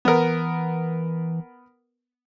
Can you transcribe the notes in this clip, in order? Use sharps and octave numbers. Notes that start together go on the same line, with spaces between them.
E3 B3 A#4